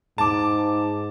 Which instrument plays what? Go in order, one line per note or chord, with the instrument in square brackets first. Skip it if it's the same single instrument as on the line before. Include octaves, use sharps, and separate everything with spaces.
[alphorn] G#2 [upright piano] A5 D6